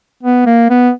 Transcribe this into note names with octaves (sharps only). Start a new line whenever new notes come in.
B3
A#3
B3